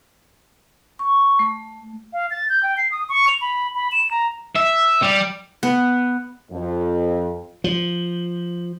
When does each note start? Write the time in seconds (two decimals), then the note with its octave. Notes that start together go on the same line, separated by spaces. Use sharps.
0.99 C#6
1.39 A3
2.13 F5
2.31 A6
2.49 G6
2.63 G5
2.77 C7
2.92 D#6
3.09 C#6
3.28 F7
3.41 B5
3.75 B5
3.92 E7
4.11 A#5
4.56 E5
5.02 G3
5.63 B3
6.51 F2
7.64 F3